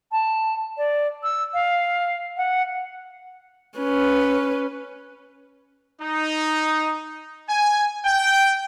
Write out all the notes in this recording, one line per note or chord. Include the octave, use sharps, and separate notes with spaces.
A5
D5
E6
F5
F#5
C#4 B4
D#4
G#5
G5